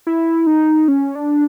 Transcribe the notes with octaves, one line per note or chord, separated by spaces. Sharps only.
E4
D#4
C#4
D4